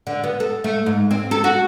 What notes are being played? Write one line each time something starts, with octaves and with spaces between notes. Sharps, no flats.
D3
B3
A4
A3
G#2
C4
A4
F#4